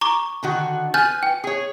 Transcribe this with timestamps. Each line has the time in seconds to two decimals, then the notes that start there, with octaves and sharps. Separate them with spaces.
0.01 A#5 C#6 D6
0.43 D3 D#3 F#4
0.94 B4 G#5 F6 G6 A6
1.23 G5
1.44 G#4 C#5